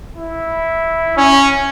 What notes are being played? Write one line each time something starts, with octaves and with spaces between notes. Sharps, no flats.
E4
C#4